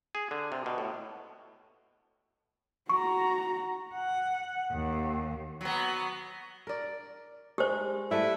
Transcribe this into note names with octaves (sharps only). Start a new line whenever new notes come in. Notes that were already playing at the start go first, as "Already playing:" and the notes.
G#4
D3
C3
B2
A2
F#4 A#5 C#6
F#5
D#2
F#3 B3
A#4 D5
G#3 G4 C5
G3 A3 E4 B4